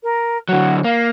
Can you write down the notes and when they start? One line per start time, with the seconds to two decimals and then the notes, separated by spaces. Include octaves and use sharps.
0.03 A#4
0.49 D3 F#3 F#4
0.84 A#3 F5